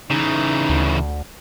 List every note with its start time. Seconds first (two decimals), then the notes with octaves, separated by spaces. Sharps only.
0.10 C#3 E3 D#4
0.69 D2